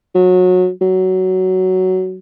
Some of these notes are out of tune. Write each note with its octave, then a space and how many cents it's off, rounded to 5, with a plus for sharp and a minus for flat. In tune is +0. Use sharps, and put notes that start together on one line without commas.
F#3 -25
F#3 +10